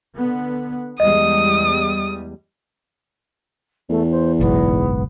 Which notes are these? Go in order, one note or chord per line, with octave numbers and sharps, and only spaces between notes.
D3 B3
E2 G3 G#3 D#5 D#6
E2 A3
C5
F#1 B1 G#2 B3